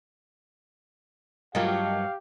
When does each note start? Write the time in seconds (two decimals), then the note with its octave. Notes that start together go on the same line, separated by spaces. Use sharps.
1.55 G2 F#3 F4 G4 A#4 D#5 F5